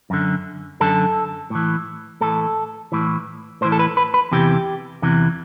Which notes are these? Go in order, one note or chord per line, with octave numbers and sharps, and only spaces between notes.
F#2 D3
F#2 D3 A4
A2 E3
A2 E3 A4
A2 E3
A2 E3 C5
A4
B4
B4
B4
E2 C3 E3 G4
E2 C3 E3